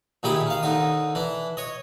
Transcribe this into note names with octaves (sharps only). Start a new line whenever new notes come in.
A#2 D#3 E4 G4 G#4
D#3 F5
D#2 D3 D#4 D#6
E3 D4
C#5 D#5